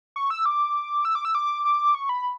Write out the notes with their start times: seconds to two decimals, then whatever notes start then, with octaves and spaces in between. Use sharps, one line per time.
0.16 C#6
0.30 E6
0.46 D6
1.05 E6
1.15 D6
1.25 E6
1.35 D6
1.65 D6
1.95 C#6
2.09 B5